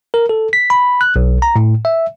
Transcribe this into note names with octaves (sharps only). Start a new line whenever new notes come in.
A#4
A4
B6
B5
F#6
B1
A#5
A2
E5